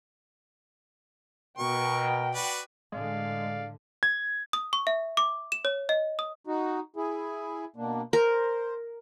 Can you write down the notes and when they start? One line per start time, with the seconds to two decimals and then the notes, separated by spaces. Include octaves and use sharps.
1.58 B2 A#4 G5 C#6
2.35 F#4 B4 D5
2.92 A2 D3 G#3 D5 F5
4.03 G#6
4.53 D#6
4.73 C#6
4.87 E5
5.17 D6
5.52 E7
5.65 C#5
5.89 D#5
6.19 D#6
6.47 D#4 F#4
6.96 E4 G#4
7.76 B2 A#3 D4
8.13 A#4 C5